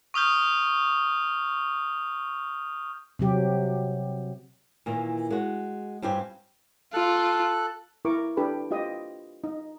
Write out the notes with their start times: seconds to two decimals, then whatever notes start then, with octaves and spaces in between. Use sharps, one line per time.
0.14 C#6 D#6 F6 G6
3.19 C3 F#3 G4
4.86 A#2 D#3 E3 A#3
5.30 G#3 F#4
6.02 G2 C4 F4 G4 G#5
6.93 F4 A4 F#6
8.05 E4 A#4 C#6 D6
8.37 D4 G4 A4 B4 B5
8.71 F4 G4 D#5 E5 D#6
9.44 D#4